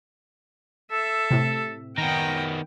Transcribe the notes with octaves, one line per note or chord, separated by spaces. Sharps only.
A4 E5
A2 C3
D#3 B3 G5 A#5